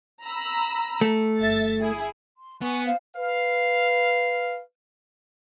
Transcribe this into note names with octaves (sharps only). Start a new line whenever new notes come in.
A#5 B5 E6
A3
G1 E5 A6
E4 G#4
C6
B3 G#5 C#6 F#6
C5 F5
B4 F5